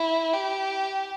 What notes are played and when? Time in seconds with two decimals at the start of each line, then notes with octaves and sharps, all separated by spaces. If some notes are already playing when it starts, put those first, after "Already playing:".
Already playing: E4
0.34 G4